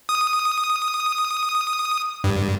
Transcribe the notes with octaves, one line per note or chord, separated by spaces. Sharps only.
D#6
G2